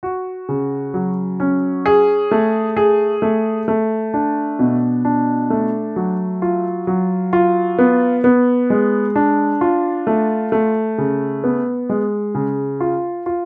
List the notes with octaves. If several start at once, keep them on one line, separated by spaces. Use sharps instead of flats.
F#4
C#3
F#3
C#4
G#4
A3
G#4
A3
A3
D4
B2
D4
A3
F#3
F4
F#3
F4
B3
B3
G#3
D4
F4
A3
A3
C#3
B3
G#3
C#3
F4
F4